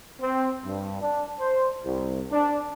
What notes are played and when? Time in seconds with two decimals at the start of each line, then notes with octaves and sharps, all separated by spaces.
0.20 C4
0.64 G2
1.00 D4
1.40 C5
1.84 C2
2.31 D4